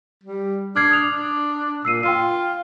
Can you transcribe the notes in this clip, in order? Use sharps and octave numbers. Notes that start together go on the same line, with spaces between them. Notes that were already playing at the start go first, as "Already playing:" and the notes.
G3
D4 F6 G#6 C7
D#6 F7
D4
A#2 E6 C7 D#7
F4 G5 C6 C7